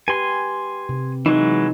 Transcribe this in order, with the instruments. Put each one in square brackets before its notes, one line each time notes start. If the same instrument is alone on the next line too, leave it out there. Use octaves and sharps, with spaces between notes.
[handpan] G4 B4 [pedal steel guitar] G#5 C6
[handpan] C3
[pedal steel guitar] E3 F#3 G#3 [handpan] D#4